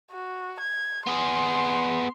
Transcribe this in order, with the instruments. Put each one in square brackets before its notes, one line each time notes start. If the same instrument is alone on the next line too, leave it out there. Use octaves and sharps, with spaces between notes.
[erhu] F#4
G#6
[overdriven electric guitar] B3 G#4 [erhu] C6